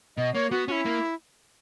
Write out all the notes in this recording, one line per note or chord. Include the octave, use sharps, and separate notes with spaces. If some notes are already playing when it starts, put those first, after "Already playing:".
B2 D#5
A#3 C#5
B3 F#4
C#4 E4 F#4
A#3